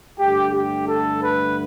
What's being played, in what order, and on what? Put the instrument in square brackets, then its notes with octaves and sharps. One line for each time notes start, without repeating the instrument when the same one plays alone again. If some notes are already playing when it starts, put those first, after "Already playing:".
[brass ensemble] G2 D3 A3 G4
G4
A4
B4